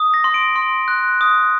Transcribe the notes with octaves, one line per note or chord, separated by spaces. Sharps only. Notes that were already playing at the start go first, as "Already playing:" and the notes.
Already playing: D#6
A#6
C6
D7
C6
F#6
D#6